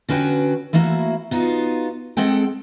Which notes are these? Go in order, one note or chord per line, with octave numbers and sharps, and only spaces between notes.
D3 C#4 F#4 B4 G5
E3 A3 A#3 E4 F#4
B3 D#4 F4 F#4
G#3 C4 A4 F#5 G5